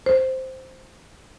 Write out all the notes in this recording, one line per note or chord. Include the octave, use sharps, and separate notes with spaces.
C5